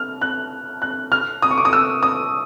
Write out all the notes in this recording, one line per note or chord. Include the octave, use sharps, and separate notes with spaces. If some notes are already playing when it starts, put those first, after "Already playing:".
Already playing: F6
F#6
F#6
F6
D#6
C#6
D6
D#6
E6
D#6